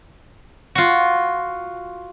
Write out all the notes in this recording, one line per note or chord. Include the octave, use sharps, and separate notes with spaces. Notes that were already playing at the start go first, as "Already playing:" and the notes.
F4 F#4